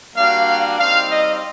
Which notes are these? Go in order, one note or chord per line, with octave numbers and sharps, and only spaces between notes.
G3 A#3 D4 F#4 F5
G3 C4 D#4 F5
D#5